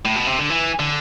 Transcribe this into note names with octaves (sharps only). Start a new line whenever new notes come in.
A2
B2
C3
D3
E3
D3